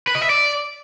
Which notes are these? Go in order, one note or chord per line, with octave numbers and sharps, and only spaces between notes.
B4
D#5
E5
D5